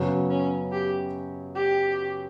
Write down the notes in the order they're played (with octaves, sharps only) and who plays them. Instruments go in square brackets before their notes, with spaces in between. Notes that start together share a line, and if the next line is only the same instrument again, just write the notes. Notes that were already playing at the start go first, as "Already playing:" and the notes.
Already playing: [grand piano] F#2 C#3 F#3 B3
[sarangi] C#4
G4
G4